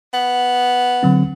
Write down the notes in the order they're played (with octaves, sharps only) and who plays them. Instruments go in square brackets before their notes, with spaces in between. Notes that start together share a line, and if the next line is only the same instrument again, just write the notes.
[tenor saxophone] B3
[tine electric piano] D3 F#3 C4